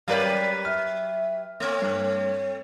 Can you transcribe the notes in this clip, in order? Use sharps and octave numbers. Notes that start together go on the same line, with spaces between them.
F#3 C#4 G4 A#4 B4 D5 F5
E5 F6
A3 C4 C#5
G2